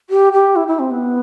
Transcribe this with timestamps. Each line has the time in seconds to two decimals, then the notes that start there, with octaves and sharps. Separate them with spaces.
0.10 G4
0.33 G4
0.56 E4
0.68 E4
0.79 C4
0.91 B3